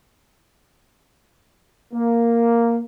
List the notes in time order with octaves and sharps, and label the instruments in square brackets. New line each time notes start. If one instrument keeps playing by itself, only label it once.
[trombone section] A#3